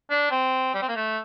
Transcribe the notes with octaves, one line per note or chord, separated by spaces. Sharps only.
D4
C4
G3
C4
A#3
A3